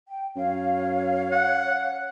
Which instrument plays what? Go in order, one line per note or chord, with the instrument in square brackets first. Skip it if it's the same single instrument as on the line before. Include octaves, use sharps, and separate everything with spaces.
[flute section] G5
[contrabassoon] F#2 [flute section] C#5 F5
[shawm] F#5